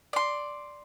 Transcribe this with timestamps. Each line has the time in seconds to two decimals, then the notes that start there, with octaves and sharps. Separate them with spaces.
0.13 D5 C6